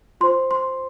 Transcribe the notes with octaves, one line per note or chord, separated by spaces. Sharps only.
F4 C5 C6
C6